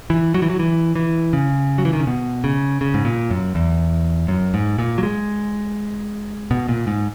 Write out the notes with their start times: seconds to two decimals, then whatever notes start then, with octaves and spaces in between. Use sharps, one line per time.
0.10 E3
0.34 F#3
0.42 E3
0.50 F#3
0.59 E3
0.96 E3
1.33 C#3
1.78 F#3
1.85 E3
1.93 D#3
2.00 C#3
2.07 B2
2.44 C#3
2.81 C#3
2.94 G#2
3.05 A#2
3.30 F#2
3.55 E2
4.28 F#2
4.54 G#2
4.78 A#2
4.98 F#3
5.03 G#3
6.51 B2
6.69 A#2
6.87 G#2